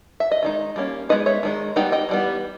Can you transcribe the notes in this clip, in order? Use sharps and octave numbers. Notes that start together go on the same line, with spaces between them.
E5
D#5
D#3 G#3 D#4
G3 A#3 C#4
G#3 B3 D#4 B4 D#5
C#5 E5
D#3 G#3 D#4
G3 B3 D#4 D#5 G5
D#5 G5
E3 G3 B3